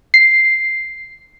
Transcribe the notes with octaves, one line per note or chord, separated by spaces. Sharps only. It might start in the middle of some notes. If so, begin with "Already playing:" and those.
C7